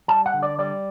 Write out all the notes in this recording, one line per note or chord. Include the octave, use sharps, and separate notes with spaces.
G3 A5
F#5
D3
D5
G3 D5